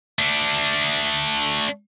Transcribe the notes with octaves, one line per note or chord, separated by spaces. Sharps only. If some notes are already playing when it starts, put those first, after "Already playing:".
A3 D4